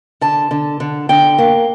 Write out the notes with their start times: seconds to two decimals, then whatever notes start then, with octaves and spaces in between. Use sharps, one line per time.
0.21 D3 A5
0.51 D3
0.80 D3
1.09 D3 G5
1.38 A#3